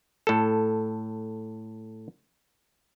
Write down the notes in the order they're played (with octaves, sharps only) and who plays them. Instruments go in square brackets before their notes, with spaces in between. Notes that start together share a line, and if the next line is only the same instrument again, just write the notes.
[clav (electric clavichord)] A2 A4